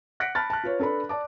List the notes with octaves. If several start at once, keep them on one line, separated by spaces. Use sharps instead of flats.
F#5 F#6 A#6 B6 C#7 D7
A5 B5 F6 F#6 A6
A5 F#6
F4 B4 C#5
D4 A4 B4 B5
D5 A5 D6